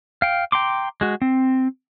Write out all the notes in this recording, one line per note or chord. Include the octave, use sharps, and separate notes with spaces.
F5 G5
G5 A#5 C6 D6
G#3 F#4
C4